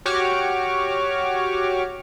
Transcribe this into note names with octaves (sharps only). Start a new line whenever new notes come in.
F#4 G4 C#5 C#6 D6 F6